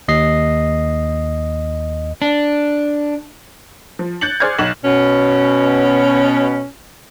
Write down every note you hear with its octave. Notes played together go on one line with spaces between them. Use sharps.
D#2 D#5 C7
D4
F3
F#6 G6 A6 C#7 F#7
G#4 C5 D5 F6 G#6
B1 E7 F#7
B2 C#4